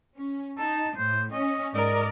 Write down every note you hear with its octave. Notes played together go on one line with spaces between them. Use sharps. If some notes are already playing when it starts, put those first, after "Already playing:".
C#4
D#4 A5
A2 C5
C#4 D#5
G#2 A#4 D5 D#5